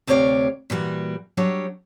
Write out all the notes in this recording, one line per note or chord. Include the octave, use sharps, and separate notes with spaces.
D2 C3 G4 C#5 D5 F5
A#2 E3 G3 F#4
F#3 G3 D4 C#5